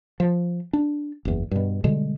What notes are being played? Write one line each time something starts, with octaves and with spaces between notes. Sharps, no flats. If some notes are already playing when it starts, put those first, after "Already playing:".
F3
D4
F#1 E2
G2 B2
B2 D3 G3 G#3